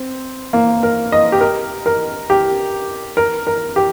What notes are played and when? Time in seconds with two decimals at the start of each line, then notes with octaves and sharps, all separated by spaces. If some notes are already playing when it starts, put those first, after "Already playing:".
Already playing: C4
0.53 A#3
0.83 A#4
1.12 D#5
1.32 G4
1.41 A#4
1.86 A#4
2.30 G4
3.17 A#4
3.47 A#4
3.76 G4